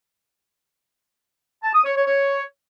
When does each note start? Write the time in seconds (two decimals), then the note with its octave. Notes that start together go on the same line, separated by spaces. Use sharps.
1.63 A5
1.74 D#6
1.85 C#5
1.96 C#5
2.06 C#5